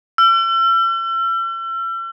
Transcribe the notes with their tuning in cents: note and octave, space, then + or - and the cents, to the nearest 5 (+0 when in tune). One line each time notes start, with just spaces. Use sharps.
E6 +40